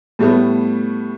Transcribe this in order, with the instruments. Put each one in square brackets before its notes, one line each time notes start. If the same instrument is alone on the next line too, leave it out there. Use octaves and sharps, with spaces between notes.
[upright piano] A2 G3 A3 B3